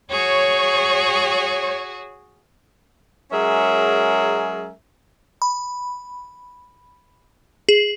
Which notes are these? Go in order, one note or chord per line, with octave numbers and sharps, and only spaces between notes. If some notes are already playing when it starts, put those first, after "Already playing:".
F#4 G#4 C#5
F#3 G#3 C#4 G#4 A#4 E5
B5
G#4